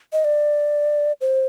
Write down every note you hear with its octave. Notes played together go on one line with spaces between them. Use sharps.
D#5
D5
C5